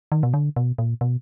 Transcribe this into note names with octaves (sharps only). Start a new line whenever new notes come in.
D#3
B2
D3
B2
A#2
B2